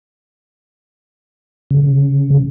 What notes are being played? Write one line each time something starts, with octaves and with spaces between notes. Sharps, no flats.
C#3